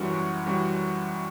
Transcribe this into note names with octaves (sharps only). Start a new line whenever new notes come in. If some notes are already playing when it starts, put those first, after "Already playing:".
Already playing: F#2 E3 G3 C#4 F#4
F#2
E3 G3 C#4 F#4